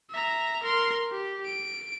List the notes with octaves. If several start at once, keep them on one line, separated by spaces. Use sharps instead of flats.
E5 A#5
A#4 C6
G4
D7